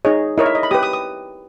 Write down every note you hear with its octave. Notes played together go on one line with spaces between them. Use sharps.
D#4 G#4 C#5 D#5
E4 A#4 C#5 D#5
E5
D#5
B5
G4 B4 D#6
D#6
D#6